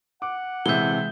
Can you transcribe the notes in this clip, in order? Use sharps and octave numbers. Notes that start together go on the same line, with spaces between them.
F#5 D6
C3 E3 G#3 E5 G6 G7